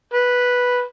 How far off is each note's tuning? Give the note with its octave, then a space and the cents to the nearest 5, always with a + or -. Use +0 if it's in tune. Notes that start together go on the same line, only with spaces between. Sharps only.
B4 -5